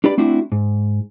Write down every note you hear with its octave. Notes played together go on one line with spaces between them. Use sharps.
D4 G4 B4 D5 B5
A3 C4 D4 E4 F#4
G#2